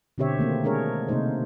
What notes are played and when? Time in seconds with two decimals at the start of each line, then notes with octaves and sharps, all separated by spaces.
0.18 B2 D3 C4 G4 C#5 E5
0.38 D#3 A3 A#3 C4
0.64 G#3 D4 G#4 A#4 C#5
1.08 C3 A3 A#3 D#4 C5